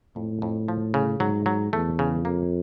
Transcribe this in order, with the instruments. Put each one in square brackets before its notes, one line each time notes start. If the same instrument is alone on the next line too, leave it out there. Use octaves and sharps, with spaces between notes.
[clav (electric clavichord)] F2 [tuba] A2
[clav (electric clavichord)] F2
F3
C#3
[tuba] G#2 [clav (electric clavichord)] F#3
[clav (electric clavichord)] F#3
[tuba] E2 [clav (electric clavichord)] A3
[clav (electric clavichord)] C#3
[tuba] F2 [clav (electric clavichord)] A#3